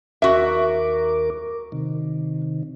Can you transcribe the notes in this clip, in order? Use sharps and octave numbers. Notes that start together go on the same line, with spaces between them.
D#2 F#4 A#4 E5 D6
C3 D#3